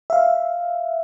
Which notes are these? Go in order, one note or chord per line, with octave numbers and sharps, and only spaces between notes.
E5 F5